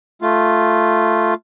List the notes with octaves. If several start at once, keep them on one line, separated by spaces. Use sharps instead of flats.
A3 F4